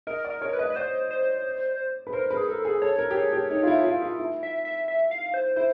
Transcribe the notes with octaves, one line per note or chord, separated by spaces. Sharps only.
A#4 D#5
D5
A#4
C#5
A#4
B4
D#5
B4
C5 D5
C5
B4
A#4 C5
B4
G#4
A4 A#4
G#4
A4 C#5
A#4
G4
G#4
G4
D#4
F4
E4
F4
F4
E4
E5
E5
E5
F5
C5
E4 C5